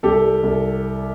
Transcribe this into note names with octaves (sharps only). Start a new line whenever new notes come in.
C2 G4 A4
G3
C2